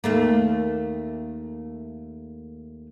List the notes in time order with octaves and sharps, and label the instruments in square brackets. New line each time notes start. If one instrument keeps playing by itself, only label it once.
[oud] D#2 A3 A#3